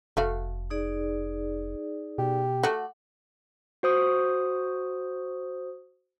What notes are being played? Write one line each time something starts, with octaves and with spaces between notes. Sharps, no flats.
F1 A3 F#4 F5
D#4 G#4 D5
B2 G4
A3 F#4 F#5 D6
F#4 C5 D#6